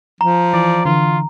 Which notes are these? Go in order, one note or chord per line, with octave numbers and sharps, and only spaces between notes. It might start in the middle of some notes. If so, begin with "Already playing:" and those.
F3 A#5
E3 D5
D3 E3 F4